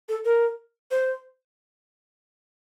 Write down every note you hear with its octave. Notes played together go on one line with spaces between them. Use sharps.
A4
A#4
C5